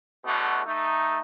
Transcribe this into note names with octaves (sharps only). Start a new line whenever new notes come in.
E2 B2 D3 A3 F#4
A3 D#4